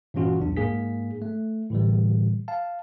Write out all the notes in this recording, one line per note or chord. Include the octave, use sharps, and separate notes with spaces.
G2 A#2 E3 C#4 F4 F#4
B1 E2 D4
G#2 A#3 G#4 B6
A3
A2 D3 E3 G3
F5 A5